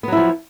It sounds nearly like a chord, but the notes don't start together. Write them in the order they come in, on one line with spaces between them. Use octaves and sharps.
B3 F#3 E4 F3